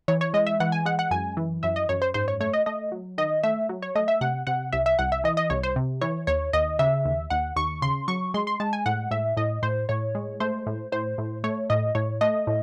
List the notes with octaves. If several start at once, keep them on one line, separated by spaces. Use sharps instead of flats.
E3 C#5
C#5
G#3 D#5
E5
E3 F#5
G#5
G#3 F#5
F#5
F#2 G#5
E3
F#2 E5
D#5
F#2 C#5
C5
G#2 C5
C#5
A3 C#5
D#5
A3 D#5
F#3
D#3 D#5
A3 E5
F#3
C#5
A3 D#5
E5
C3 F#5
C3 F#5
C2 E5
E5
C2 F#5
E5
E3 D#5
D#5
C2 C#5
C5
C3
E3 C#5
D#2 C#5
D#2 D#5
C#3 E5
D#2
D#2 F#5
D#2 C#6
C#3 C6
F#3 C#6
G#3 C6
C6
G#3 A5
G#5
A2 F#5
A2 E5
A2 D#5
A2 C5
A2 C#5
G#3
A3 C5
A2
A2 C5
A2
A3 C#5
A2 D#5
A2 C#5
A3 D#5
A2